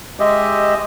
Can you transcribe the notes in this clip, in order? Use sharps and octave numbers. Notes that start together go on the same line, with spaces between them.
G#3 G4 D#5 E5